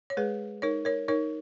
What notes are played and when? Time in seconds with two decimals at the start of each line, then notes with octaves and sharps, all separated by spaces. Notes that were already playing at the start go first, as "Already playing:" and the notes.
0.10 C#5
0.17 G#3 G#4 B4
0.62 D#4 A#4 C#5
0.85 A#4 C#5
1.08 D#4 A#4 C#5